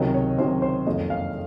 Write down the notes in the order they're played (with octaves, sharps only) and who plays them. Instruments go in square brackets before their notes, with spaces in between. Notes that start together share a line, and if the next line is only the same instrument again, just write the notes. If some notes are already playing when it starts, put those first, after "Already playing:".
Already playing: [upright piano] C#2 C3 D#3 F#3 D#5
C#5
C#2 C3 D#3 F#3 C5
C5
F#1 F2 D#3 F#3 D#5
F5